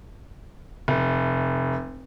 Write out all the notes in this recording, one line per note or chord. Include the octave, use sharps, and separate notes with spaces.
F1